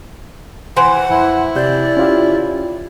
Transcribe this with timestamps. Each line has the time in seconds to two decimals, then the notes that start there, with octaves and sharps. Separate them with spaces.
0.77 E3 C5 F#5
1.10 F2 E4
1.55 C3 G4 D5 G6
1.97 C#4 F4 G4